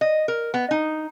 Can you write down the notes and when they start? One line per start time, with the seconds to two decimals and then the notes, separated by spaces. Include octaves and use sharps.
0.01 D#5
0.28 A#4
0.54 B3
0.71 D#4